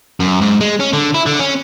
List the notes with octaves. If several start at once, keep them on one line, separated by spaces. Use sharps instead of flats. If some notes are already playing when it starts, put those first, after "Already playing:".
F#2
G#2
G#3
C#4
D3
E4
D3
C#4